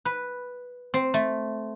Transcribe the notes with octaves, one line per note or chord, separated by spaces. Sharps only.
B4
C4
A3